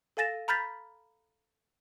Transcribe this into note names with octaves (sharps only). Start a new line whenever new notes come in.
A4 F5 G#5 A6 A#6 E7
A#5 B5 F6 G6 A6 B6